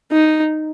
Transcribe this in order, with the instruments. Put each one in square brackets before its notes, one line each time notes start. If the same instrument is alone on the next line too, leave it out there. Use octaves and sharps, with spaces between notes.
[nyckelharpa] D#4